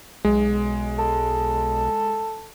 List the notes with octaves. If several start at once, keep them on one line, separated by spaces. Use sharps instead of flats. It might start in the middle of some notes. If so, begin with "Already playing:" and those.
B1 G#3
A4